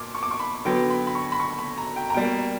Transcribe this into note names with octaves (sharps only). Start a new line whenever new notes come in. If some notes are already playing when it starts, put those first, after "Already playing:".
Already playing: A#2 D6
C#6
D6
C#6
B5
D3 F#3 B3 G5
B5
B5
C#6
B5
C#6
B5
A#5
G5
A#5
B2 G3 A#3 G5